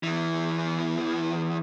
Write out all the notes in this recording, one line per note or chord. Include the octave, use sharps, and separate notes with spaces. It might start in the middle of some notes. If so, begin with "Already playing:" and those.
E2 E3